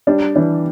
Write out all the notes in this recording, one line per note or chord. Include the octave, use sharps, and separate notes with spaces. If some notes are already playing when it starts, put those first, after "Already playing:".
G3 D4
E3 D4